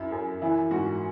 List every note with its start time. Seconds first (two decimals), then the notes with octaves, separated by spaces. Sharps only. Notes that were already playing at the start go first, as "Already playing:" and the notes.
Already playing: F#2 E4
0.12 F#2
0.42 E3 E4
0.71 G#2 F#4